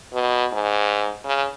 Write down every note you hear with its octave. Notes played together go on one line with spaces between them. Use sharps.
B2
G#2
C#3